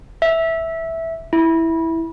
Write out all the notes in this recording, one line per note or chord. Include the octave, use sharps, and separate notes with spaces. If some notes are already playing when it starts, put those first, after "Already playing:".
E5
E4